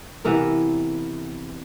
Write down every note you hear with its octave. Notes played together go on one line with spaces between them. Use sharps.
C3 E3 B3 A#4